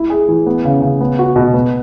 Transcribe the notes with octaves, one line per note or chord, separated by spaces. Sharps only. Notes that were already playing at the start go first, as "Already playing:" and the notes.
Already playing: E4
G#4
E3
B3
C#3
C#3
B3
F#4
B2
B3